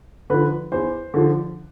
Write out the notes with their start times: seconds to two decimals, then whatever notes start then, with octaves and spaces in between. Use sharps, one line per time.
0.30 D3 F3 B4
0.72 E2 C5
1.14 D3 F3